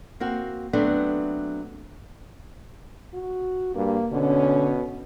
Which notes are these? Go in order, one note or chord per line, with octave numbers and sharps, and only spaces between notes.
A#3 C4 F#4
F#3 A3 B3 C4 D4
F#4
G2 A#3
B2 D3 C#4